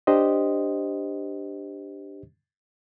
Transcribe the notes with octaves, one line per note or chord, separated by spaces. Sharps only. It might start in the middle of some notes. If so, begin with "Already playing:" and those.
D4 G4 C5 D#5